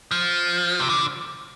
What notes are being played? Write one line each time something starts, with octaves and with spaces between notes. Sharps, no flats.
F3
C3
D3